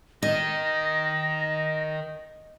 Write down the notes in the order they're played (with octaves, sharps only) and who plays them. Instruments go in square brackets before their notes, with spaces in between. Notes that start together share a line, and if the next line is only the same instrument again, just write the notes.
[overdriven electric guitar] D#3 [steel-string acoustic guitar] D#5 [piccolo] A#6